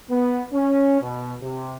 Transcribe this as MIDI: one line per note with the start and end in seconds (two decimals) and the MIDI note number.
0.10 0.44 59
0.53 1.00 61
1.01 1.35 47
1.41 1.77 48